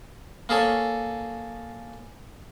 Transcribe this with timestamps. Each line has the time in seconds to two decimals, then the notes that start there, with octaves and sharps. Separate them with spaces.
0.49 A#3 G#4 A4 C#5